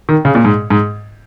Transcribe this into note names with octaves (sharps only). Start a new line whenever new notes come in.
D#3
C#3
A#2
G#2
G#2